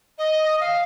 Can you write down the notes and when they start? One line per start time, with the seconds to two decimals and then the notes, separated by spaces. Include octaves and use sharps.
0.18 D#5
0.60 F5